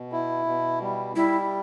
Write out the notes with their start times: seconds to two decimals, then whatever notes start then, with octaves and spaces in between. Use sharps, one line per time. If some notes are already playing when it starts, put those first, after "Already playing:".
Already playing: B2
0.12 E4
0.46 B2
0.81 G3
1.16 G3 E4